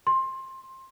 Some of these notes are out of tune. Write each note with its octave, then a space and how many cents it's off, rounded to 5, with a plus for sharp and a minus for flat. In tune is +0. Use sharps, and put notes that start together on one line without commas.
C6 +20